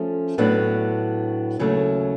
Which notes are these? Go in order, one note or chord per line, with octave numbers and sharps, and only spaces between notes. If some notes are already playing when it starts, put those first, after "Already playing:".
Already playing: F3 A3 C#4
A2 F#3 B3 D4
D#2 C#3 F#3 A3